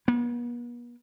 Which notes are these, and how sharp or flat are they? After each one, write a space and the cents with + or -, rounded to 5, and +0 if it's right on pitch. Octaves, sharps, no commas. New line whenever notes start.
B3 -45